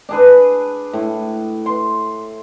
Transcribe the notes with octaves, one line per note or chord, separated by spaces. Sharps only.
D4 G#4 B4
A2
C6